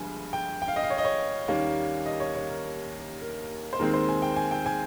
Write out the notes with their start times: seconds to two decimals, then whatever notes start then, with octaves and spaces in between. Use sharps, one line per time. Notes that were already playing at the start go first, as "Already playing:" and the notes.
Already playing: G1 G2 F3 G#3 G#5
0.33 G5
0.62 G5
0.68 F5
0.76 D#5
0.83 F5
0.90 C#5
0.98 D#5
1.05 C#5
1.48 D#2 D#3 G3 A#3 C#4
2.06 D#5
2.20 C#5
2.35 C#5
2.49 A#4
3.22 A#4
3.73 C5
3.79 D#2 D#3 G#3 C4 A#4
3.94 C5
4.09 G#5
4.22 G5
4.36 G#5
4.51 G5
4.66 G#5